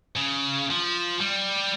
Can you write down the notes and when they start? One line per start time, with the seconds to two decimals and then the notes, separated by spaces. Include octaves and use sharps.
0.16 C#3
0.70 F3
1.20 G3